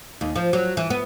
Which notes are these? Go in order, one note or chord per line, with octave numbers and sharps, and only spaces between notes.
D#2
F3
F#3
E3
B3